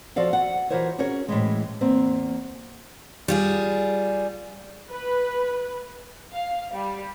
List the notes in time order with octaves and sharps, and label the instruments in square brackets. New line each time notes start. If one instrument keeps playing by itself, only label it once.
[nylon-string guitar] F3 F#4 A4 D5 F5
F#4 F#5
E3 F4 F#4 A#4 C5 C#5
C#4 F#4 G#4 A#4 C#5
A2 E3 G#3
E2 A#3 C4
[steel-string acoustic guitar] G3 F4 G#4
[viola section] B4
[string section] F5
G3